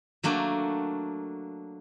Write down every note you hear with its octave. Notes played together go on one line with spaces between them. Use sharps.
F#3 A3 A#3 D4